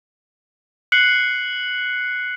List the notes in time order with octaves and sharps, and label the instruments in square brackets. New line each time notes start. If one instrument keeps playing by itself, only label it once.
[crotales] F#6 C7 C#7 F#7